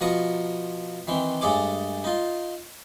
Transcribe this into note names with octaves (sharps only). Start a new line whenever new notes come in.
B2 F3 A#4 A#5 C#6 D#6
D#3 E3 C4
G2 G#3 A3 G#4 C#5 D6
D#4 F4